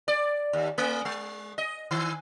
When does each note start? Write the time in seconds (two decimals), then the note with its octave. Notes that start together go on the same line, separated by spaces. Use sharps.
0.08 D5
0.53 D#2
0.78 A3
1.05 G#3
1.58 D#5
1.91 D#3